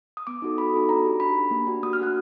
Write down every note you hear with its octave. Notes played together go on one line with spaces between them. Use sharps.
D#6
B3 D6
D#4 F#4 A4
B3 B5
D#4 F#4 A4
D4 A#5
G4
D4 B5
G4
A#3
D4 F#4
A#3 D#6
F6
D4 F#4 F#6